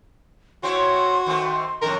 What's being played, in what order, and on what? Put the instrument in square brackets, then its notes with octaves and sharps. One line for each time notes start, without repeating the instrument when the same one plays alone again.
[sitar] C4 E4 C#5 [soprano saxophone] F#4 [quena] C6
[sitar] D#3 A3 C4
[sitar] F2 A2 D#3 [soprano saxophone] A#4